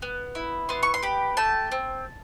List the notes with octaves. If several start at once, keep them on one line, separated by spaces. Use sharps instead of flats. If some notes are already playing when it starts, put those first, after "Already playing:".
B3
E4
B3 C6
C#6
C6
G4 B5
A3 A5
C4